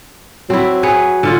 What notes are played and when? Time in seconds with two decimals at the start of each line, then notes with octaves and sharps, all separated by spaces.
0.50 F#3 C4 E4
0.83 G#4 B4 C#5
1.23 D3 F4 F#4